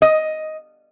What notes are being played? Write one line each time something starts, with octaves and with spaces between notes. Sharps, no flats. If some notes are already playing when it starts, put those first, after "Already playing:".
D#5